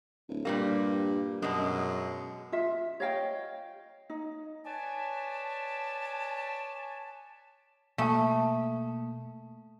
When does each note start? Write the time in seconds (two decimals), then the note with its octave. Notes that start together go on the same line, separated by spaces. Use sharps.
0.28 D1
0.45 G2 A#2 G3 A#3
1.42 F#2 B2 G#3
2.52 F4 E5
3.00 C#5 D#5 F5 G5
4.10 D#4
4.64 B4 C#5 D5 G#5 A5
7.98 B2 A3 A#3 F5 A5 D#6